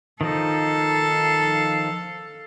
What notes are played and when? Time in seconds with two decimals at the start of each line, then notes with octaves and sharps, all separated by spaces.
0.21 D#3 F3 D#4 A4 F5